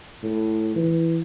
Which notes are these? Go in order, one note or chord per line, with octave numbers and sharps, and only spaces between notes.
A2
E3